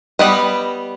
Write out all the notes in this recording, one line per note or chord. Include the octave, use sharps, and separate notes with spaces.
G3 B3 D#5